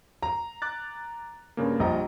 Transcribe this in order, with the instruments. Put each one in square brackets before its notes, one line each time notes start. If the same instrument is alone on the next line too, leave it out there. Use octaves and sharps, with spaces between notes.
[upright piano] A#5
[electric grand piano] D6 F#6 A6
G2 C#3 A#3
[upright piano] A#1 [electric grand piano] G3 D#5 A#5